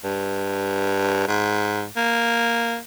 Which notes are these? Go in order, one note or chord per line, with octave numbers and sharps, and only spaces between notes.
G2
G#2
A#3